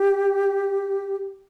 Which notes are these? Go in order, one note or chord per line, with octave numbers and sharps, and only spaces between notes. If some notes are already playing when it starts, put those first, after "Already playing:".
Already playing: G4